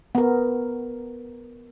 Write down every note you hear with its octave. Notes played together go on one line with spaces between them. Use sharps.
B3 A#4